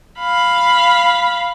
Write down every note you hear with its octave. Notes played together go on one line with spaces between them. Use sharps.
F5 B5